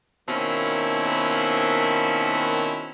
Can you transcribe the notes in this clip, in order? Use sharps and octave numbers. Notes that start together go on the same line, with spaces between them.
B2 D#3 A#3 C4 C#4 E4